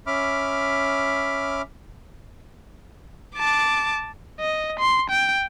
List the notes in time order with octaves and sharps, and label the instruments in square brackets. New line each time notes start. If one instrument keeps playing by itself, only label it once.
[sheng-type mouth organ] C#4 E5 B5 D6 F6
[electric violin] A5 D6
D#5
C6
G5